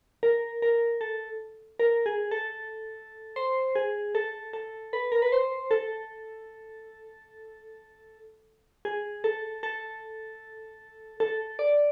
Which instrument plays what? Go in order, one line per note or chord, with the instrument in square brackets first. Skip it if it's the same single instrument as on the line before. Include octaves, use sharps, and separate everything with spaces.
[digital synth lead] A#4
A#4
A4
A#4
G#4
A4
C5
G#4
A4
A4
B4
A#4
B4
C5
A4
G#4
A4
A4
A4
D5